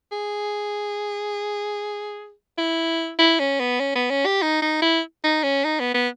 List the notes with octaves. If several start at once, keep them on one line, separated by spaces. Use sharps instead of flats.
G#4
E4
E4
C#4
B3
C#4
B3
C#4
G4
D#4
D#4
E4
D#4
C#4
D#4
B3
B3